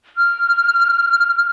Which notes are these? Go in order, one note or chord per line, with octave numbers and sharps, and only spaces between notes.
F6